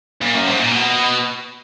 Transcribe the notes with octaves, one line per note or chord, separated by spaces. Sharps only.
A#2
F#2
G#2
A#2
B2